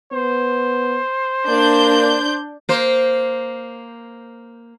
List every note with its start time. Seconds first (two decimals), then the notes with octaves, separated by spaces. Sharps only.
0.13 B3 C5
1.49 A#3 D4 G6
2.69 A#3 C5